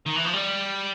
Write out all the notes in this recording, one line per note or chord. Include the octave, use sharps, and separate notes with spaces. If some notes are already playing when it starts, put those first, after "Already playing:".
D#3
E3
F3
G3